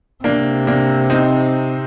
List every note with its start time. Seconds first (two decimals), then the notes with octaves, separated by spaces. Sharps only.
0.24 C3 A#3 D4
0.67 A#3 D4
1.10 C4 D#4